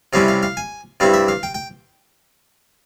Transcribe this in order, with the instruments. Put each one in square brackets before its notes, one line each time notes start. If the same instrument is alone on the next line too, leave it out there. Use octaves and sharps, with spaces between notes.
[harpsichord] C3 G3 C#4 E4 F5
F5
F5
G#5
G2 G3 C4 E4 F5
E5
F5
G5
G5